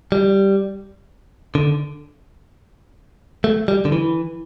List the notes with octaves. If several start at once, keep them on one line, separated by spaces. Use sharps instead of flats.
G3
D3
A3
G3
D3
E3